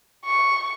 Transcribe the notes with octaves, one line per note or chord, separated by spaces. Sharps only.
C#6